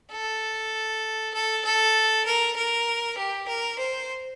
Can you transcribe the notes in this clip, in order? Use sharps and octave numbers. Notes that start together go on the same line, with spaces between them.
A4
A4
A4
A#4
A#4
G4
A#4
C5